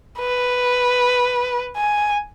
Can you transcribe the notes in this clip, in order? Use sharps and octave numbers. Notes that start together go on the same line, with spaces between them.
B4
G#5